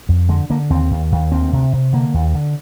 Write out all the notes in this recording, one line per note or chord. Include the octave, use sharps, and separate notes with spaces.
F2
D3 G#3
D3 A#3
D#2 C4
D#2
D#2
D2 C4
C3
C3
D3 A#3
D#2
D3